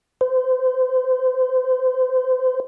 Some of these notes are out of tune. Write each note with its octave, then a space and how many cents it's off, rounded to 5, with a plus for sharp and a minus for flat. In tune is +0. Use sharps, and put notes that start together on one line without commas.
C5 -30